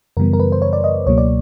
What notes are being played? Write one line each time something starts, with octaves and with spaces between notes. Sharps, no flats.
F#2 C#3 E3 G3 B3 A#4
A#4
B4
C5
C#5
D5
D#5
C#2 B2 F#3 A#3 C#5
D5